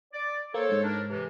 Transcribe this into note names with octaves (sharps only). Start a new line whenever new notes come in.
D5
A#3 A4 C5 C#5
G#2 G#3
D4 A#4
C3 E3